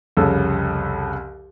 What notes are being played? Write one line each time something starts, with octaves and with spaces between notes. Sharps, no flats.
C2 F2 C#3 A4